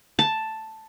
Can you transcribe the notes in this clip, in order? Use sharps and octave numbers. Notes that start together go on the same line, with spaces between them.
A5